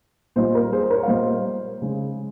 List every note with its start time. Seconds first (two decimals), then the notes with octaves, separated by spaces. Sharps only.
0.36 A#2 G3 C5 D#5
0.55 A#4
0.73 G#4 C5
0.90 A#4 C#5
1.03 F5
1.07 A#2 G3 C5 D#5
1.82 C#3 G#3